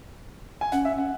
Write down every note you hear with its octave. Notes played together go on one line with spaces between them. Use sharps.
G#5
C#4 F#5
E5
F#5